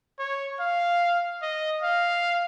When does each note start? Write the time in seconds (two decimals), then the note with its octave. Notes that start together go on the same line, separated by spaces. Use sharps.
0.19 C#5
0.60 F5
1.42 D#5
1.83 F5